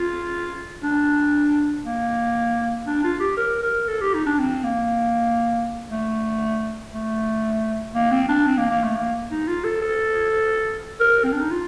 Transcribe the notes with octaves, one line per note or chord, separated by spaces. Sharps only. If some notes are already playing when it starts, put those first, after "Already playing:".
Already playing: F4
D4
A#3
D4
F4
G4
A#4
A#4
A4
G4
D#4
D4
C4
A#3
A3
A3
A#3
C4
D4
C4
A#3
A#3
A3
A#3
D#4
F4
A4
A4
A#4
C4
D4
D#4
F4